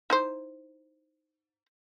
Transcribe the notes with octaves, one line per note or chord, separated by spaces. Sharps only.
D#4 E4 C5